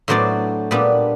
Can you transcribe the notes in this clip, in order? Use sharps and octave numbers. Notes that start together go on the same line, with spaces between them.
A2 F#3 B3 D4 C5 D5
A#2 G3 B3 D4